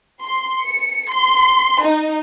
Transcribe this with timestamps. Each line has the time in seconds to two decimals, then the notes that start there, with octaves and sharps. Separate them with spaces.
0.23 C6
0.64 C#7
1.13 C6
1.85 D#4